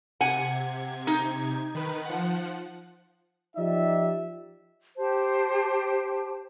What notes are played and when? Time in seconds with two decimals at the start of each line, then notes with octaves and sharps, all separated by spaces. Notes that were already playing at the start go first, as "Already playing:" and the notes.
0.21 C3 F#5 G#5 G#6
1.07 D#4
1.75 D#3 B4
2.05 F3 F#5
3.56 F3 D#4 G4 D5 E5
4.98 G4 C5 A5